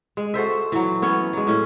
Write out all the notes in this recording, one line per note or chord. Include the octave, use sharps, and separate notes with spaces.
G#3
F#4 A4 C5 E5
E3 F#3
B3 C#4 C#5
F#3 G#3
A2 C#4